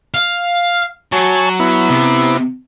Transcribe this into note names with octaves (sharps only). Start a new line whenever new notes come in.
F5
F#3 C#5 G#5 A5
B3 E4
C3